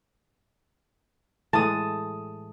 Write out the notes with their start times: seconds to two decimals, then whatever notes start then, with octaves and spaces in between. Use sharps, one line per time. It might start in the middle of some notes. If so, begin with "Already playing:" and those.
1.53 A2 E3 G#3 A5 D#6